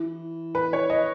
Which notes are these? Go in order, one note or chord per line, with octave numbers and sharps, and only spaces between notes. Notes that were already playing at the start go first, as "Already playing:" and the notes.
Already playing: E3
B4
C#5
D#5